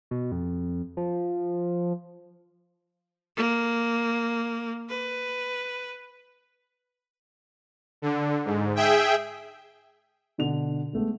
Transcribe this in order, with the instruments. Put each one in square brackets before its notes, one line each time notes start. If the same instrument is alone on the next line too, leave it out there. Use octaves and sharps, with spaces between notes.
[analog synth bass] B2
F2
F3
[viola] A#3
B4
[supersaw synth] D3
G#2
G#4 E5 G5
[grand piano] B2 D3 F7
G#3 A3 B3